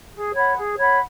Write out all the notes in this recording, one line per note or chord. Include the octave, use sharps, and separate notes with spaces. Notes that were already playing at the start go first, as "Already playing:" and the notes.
G#4
C#5 F#5 B5
G#4
C#5 F#5 B5